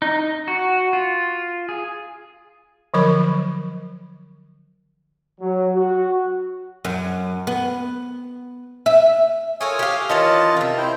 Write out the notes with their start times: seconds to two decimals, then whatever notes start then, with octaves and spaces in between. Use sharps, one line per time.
0.02 D#4
0.48 F#4
0.93 F4
1.69 G#4
2.94 D3 F3 F#3 A#4 B5
5.41 F#3
5.75 F#4
6.85 F#2
7.47 B3
8.86 E5
9.61 F4 A4 A#4 C#5 G#5 D#6
9.79 G4 F5
10.09 D#3 E3 C#4 F4 D#5 A5
10.57 C3 D#3
10.78 E4 C5 G5